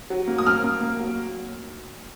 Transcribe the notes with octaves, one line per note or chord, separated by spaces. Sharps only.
F#3
A#3
D#6
A#3 F6
A#3
A#3
F#3